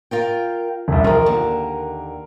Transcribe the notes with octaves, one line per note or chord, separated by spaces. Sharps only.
F4 A#4 G5
E1 C2
D#3 F3 A#4 C6
D#2 D3